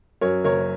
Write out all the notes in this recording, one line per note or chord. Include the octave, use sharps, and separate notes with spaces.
F#2 A#4 C#5
F#1 A#4 C#5